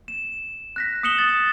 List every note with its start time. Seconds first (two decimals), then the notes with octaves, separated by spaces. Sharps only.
0.08 E7
0.76 F#6 A#6 B6
1.03 D#6 F#6 C#7 E7 F#7 G7
1.18 D#6 A6